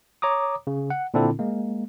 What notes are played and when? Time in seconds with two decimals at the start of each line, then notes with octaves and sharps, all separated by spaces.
0.22 C#5 A#5 D6 D#6
0.67 C#3
0.90 F#5
1.14 A#2 D3 C4 D4 E4 A4
1.39 G#3 A#3